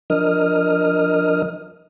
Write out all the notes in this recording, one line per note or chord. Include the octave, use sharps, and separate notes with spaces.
F3 D4 A#4 D#5 D#6 F6